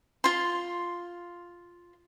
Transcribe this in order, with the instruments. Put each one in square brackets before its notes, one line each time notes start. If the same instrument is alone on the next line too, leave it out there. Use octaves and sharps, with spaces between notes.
[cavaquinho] F4 C6